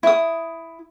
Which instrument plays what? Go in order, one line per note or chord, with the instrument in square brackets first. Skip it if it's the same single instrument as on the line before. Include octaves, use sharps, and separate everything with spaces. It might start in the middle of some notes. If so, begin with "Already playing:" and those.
[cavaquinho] E4 D#6